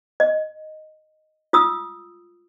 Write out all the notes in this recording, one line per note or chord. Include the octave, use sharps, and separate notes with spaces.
D#5
F4 D#6 E6